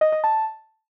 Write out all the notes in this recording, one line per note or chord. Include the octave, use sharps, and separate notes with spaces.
D#5
D#5
A5